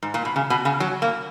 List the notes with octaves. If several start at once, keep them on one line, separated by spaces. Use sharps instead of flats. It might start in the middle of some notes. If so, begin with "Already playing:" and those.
G#2
A#2
B2
C#3
B2
C#3
F#3
A#3